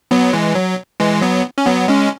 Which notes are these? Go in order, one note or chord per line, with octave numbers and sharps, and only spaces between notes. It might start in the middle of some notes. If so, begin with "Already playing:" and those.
F#3 B3
E3 G#3
F#3
E3 G#3
F#3 B3
C#4
F#3 B3
G#3 C#4